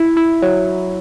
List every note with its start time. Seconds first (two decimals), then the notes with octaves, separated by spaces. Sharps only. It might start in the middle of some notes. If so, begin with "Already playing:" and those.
Already playing: E4
0.17 E4
0.42 F#3